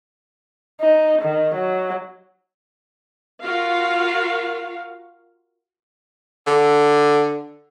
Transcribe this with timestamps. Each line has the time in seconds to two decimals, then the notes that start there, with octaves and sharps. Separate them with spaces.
0.81 D#4
1.22 D#3
1.55 F#3
3.43 F4 F#4 A#4 F5
6.47 D3